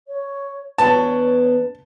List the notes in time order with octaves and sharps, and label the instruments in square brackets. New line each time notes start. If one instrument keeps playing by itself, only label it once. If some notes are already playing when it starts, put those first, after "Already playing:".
[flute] C#5
[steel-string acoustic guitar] E2 B3 D4 [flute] C#5 [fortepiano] A5